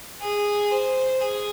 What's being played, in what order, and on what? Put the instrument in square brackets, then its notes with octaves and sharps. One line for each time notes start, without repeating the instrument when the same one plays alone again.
[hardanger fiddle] G#4
C5
G#4